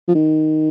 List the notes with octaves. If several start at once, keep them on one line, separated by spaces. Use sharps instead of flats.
F3
D#3